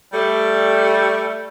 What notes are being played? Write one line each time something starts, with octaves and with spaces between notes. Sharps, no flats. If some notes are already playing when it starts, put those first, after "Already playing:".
G3 A3